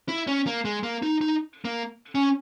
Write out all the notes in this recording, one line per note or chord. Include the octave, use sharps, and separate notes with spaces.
E4
C#4
A#3
G#3
A#3
D#4
D#4
A#3
C#4